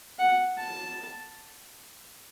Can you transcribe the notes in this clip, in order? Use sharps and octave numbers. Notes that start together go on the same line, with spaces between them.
F#5
A5